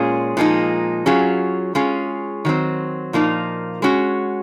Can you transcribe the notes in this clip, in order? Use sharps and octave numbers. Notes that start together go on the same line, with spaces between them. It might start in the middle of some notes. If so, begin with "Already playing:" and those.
Already playing: A#2 G#3 C#4 F4 G#4
A#2 F3 G#3 D#4
F#3 C#4 F4 G#4
G#3 C#4 F4 G#4
D#3 F#3 C4
A#2 F3 A#3 D#4
G#3 C#4 F#4